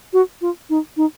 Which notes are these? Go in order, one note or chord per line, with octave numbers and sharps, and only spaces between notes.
F#4
F4
D#4
D#4